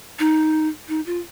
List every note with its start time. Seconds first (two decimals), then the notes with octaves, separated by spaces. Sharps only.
0.19 D#4
0.89 D#4
1.06 F4